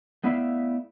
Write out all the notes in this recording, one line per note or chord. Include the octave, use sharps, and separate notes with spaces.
A3 B3 E4 D5 E5 F5